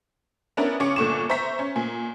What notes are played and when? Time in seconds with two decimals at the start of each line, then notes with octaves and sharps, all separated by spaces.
0.57 B3 C#4 D4 E4 A#4 B4
0.80 C#3 C#4 C#6 D6 C#7
0.96 G1 A#2 D3 C#6 D6 E7
1.30 C5 E5 A#5 C#6 B6
1.59 C#4
1.76 A#2 G#5